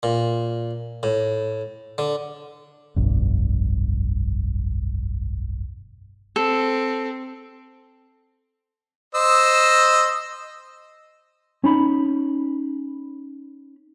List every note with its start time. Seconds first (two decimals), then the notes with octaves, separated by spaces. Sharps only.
0.03 A#2
1.03 A2
1.98 D3
2.96 F1 B1 G2
6.36 C4 A4
9.15 C5 D#5 E6
11.64 C#4 D#4 B5